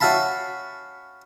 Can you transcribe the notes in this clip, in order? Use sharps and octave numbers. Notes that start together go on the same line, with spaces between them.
C#4 F#4 E5 F5 A5 B5